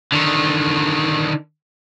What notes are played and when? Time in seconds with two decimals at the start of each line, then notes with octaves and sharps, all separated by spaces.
0.12 D3 D#3